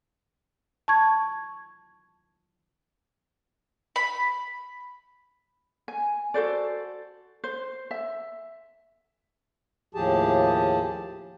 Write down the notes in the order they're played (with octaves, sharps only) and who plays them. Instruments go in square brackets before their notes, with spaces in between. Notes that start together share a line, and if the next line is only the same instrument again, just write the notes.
[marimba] A5 C#6 G#6
[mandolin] B5
[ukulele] G#5
F#4 A4 C5 D5
C5
E5
[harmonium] D#2 A2 F3 G4 G#4 A5